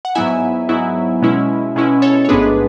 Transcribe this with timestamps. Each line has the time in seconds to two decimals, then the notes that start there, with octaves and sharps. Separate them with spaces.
0.05 F#5
0.15 G#2 F#3 B3 E4 E5 G#5
0.69 G#2 F#3 B3 E4
1.22 B2 G#3 C#4 E4
1.76 B2 G#3 C#4 E4
2.02 A4 C#5
2.25 C#5
2.29 A1 G#2 G#3 B3 D4 G#4 B4